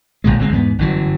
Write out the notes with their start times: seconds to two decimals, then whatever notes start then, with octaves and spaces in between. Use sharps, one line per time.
0.24 F1 C2 A#2 G#3
0.39 F#1 D3 G#3 C4
0.52 E2 G#2 B3
0.78 G1 F#2 E3 F#3